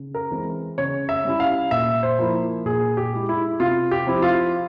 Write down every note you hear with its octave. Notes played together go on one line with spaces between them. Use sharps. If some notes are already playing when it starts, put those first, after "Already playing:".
Already playing: C#3
A#4
E3 G#3 C4
C#3 C#5
E5
G3 C#4 E4
F5
A#2 E5
C5
F3 A#3 E4
A#2 G#4
G4
G#3 E4
E4
C3 F4
G4
F3 C4 E4
F4